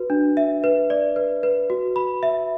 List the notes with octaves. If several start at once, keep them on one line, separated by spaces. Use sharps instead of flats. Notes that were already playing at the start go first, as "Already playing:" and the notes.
Already playing: F#4 B4
D4
E5
B4
D5
B4
B4
F#4
B5
E5